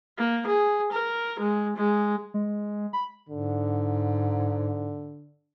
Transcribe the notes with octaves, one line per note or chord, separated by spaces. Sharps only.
A#3
G#4
A#4
G#3
G#3
G#3
B5
G#2 D3